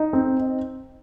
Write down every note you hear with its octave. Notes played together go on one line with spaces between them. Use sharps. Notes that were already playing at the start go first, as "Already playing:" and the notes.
Already playing: D#4
C4